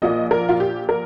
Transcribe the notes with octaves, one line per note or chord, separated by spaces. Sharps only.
A#1 A#2 F3 A#3 D#5
A#4
F4
G4
A#4